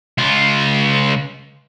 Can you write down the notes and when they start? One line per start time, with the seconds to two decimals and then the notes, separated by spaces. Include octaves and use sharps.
0.18 C#2 F4